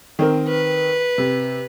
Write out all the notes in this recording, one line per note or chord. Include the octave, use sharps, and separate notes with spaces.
D#3 C4 A#4
B4
C3